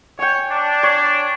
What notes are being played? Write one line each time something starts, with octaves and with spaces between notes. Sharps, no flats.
C#5 G5 G#5
D4
C#5